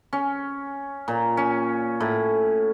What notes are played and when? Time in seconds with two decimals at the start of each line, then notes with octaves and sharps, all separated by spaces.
0.13 C#4
1.08 A#2
1.37 C#4
2.00 A2